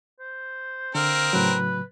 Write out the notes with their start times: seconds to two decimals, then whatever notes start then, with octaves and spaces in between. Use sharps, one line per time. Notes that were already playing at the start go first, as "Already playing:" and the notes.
0.20 C5
0.95 D3 C4 A#4 F5
1.33 A2 C#3 F#3 B4